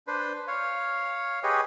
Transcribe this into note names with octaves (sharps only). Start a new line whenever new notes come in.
D4 B4 C5
C#5 F5
G4 G#4 B4 C#5 D#5